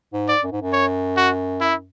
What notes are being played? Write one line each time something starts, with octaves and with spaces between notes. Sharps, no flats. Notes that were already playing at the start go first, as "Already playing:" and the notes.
G#2
D5
F#2
G#2
F#2
C#5
F#4
E4